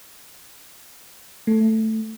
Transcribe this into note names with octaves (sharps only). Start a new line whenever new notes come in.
A3